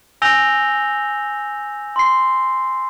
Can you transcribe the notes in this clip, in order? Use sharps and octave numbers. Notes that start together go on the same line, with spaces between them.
G#5 E6 G6 A#6 F7 G7
C6 C7